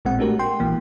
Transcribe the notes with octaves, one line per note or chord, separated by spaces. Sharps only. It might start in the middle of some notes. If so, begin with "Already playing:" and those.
A1 A#2 G#3 C4 F#5
G#3 A3 D4 F#4 G4 A#4
G5 C6
A#1 A#2 E3 A#3